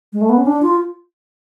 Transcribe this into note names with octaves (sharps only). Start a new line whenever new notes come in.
G#3
A3
B3
C#4
D4
F4